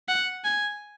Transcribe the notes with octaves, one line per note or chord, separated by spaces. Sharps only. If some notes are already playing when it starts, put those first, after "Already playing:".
F#5
G#5